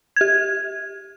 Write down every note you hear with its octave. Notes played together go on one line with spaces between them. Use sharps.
G4 G#6